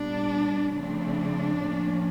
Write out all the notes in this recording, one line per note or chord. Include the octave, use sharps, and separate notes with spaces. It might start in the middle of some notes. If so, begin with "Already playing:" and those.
Already playing: A#2 G3 B3 D4
C#3 F3 A3 C4 D4
A2 F3 A#3 C#4